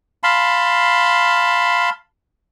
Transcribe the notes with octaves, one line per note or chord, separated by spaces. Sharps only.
F5 A5 B5 C6